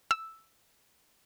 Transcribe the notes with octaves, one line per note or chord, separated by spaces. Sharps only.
E6